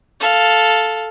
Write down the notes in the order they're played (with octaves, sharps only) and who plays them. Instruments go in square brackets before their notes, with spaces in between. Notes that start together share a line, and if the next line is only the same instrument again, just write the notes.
[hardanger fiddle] A4 F5